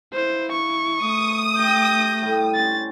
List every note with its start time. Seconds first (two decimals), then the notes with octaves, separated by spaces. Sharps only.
0.14 E4 B4 C5 F5
0.52 C#6
1.02 A3 D#6
1.58 G4 E5 G6 A#6
2.22 A2 G3
2.55 C#4 C5 A6